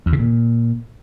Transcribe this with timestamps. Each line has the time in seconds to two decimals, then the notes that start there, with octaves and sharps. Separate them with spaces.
0.06 E2
0.13 C#3
0.19 A#2